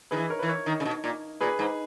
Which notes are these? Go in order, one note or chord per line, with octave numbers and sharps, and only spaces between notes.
D#3 G#4 B4
E3
A#4 C#5
E3 B4
A#4 C#5
D#3
C#3
B2
A#2
A#2 G#4 B4
G#2